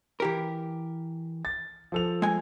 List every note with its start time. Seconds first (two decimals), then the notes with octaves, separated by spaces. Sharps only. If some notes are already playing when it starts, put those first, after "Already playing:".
0.20 E3 G4 A#4
1.45 A6
1.92 F3 A4 F7
2.22 G#3 G#5